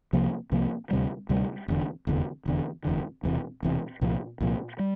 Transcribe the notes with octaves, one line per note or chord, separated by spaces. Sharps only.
C2 C3 F3 A#3
C2 C3 F3 A#3
D2 C3 G3
D2 C3 G3
F1 E2 D3
F1 E2 D3
F1 E2 D3
F1 E2 D3
E1 E2 C3
E1 E2 C3
C2 A#2 F3
C2 A#2 F3
G3